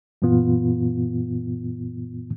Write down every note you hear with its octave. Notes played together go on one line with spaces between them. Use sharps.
F#2 A#2 E3 B3 F4